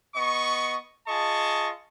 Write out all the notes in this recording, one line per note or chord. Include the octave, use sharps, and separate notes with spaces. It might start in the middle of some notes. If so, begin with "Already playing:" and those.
B3 D#5 C#6
F4 G#4 D#5 A5 C#6